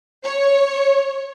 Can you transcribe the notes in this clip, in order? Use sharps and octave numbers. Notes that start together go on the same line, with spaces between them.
C#5